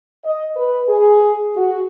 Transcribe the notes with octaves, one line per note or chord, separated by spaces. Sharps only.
D#5
B4
G#4
F#4